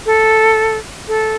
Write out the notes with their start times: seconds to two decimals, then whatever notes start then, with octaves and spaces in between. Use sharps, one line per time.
0.05 A4
1.08 A4